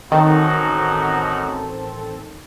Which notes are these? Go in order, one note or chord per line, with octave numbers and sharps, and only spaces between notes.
A1 F#2 D#3 C4 D#4 F#4 A4